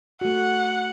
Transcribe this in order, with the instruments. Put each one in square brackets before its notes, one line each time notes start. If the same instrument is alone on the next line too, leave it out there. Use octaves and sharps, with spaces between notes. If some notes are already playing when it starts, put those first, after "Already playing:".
[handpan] A3 F#4 [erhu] F#5